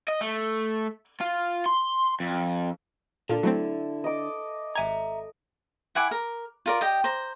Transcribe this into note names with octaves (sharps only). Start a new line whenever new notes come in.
D#5
A3
F4
C6
F2
A#2 D3 F4 A4
F#3 A3 C4 E4
D#5 D6
G#1 E5 G#5 A#5 G#6
E4 F#5 G#5 D6
A#4
F4 A#4 D5
G4 D#5 G5
C5 A#5